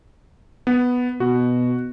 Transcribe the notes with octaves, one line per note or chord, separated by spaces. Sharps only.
B3
B2 F#4